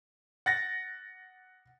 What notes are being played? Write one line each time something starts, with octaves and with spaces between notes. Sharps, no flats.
F#5 A6 A#6